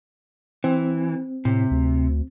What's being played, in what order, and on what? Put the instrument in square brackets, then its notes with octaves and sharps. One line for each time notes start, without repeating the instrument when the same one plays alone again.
[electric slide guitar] E3 [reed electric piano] C4
[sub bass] A2 [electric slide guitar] C3
[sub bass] D2